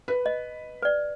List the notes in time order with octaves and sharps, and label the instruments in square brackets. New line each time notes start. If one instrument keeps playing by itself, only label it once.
[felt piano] B4
[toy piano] D#5
B4 D5